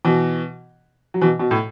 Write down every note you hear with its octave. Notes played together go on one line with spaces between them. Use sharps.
B2 E3
F#3
B2 E3
B2
A2